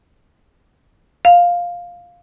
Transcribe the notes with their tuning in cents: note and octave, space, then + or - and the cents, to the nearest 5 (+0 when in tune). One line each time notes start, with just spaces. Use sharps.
F5 +5